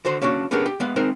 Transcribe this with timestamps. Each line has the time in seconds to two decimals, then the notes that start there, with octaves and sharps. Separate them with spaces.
0.05 D3 F#4 C5 C6
0.22 A#3 C#4 D4 F4 F#4
0.51 B3 C#4 D4 G4 G#4 A#4
0.66 G4
0.80 G#3 B3 F5
0.96 G#3 C4 D#4 A#4 C5